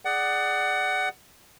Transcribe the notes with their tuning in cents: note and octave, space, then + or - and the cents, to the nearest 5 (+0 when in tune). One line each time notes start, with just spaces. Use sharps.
G#4 +0 D5 +15 F#5 +20